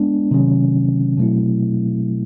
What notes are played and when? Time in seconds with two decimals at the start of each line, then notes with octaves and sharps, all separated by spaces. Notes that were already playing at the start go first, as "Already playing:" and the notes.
Already playing: G#3 B3 D4
0.31 C3 D#3 F#3 A3 C#4
1.17 B2 F#3 A3 C4 E4